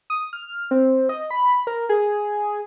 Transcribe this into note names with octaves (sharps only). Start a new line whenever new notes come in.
D#6
F6
C4
D#5
B5
A#4
G#4